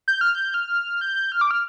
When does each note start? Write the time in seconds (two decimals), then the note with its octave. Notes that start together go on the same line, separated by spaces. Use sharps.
0.08 G6
0.21 F6
0.35 G6
0.54 F6
1.01 G6
1.32 F6
1.41 D6
1.51 F6